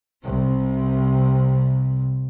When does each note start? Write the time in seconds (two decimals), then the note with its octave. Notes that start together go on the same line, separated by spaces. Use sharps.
0.23 C2 C3